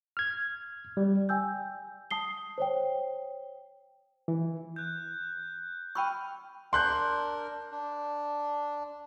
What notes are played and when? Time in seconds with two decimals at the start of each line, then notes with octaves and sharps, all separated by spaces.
0.17 F6 G#6
0.97 G3
1.29 G5 G#5 E6 G6
2.11 A5 D#6 C7 G7
2.58 C5 C#5 G5
4.28 E3
4.76 F#6 G6
5.95 G5 B5 C#6 E6 F6 D#7
6.73 D4 A#4 C6 F#6 G6
7.71 D4